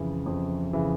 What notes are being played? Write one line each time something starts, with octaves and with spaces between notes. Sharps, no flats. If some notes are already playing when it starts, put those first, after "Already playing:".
Already playing: F2 C#3 E3
F2
C#3 E3